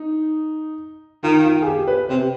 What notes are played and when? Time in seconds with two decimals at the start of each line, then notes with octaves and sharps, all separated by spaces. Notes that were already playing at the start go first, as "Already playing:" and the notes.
Already playing: D#4
1.23 D#3 F4
1.45 F4
1.62 G#4
1.67 G4
1.88 B4
2.09 C3 C5